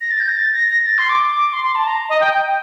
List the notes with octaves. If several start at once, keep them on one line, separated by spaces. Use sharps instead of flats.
A#6
A6
G6
A#6
A6
A#6
A#6
A6
C6
D6
C6
C6
A5
A#5
D#5
G5
G5